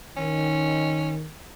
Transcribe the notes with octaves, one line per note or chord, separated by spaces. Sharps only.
D#3 C#4